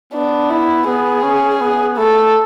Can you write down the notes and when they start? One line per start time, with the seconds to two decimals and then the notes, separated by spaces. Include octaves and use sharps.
0.13 B3 D4
0.50 E4
0.87 B3 G#4
1.23 C#4
1.61 B3
1.97 A3 A4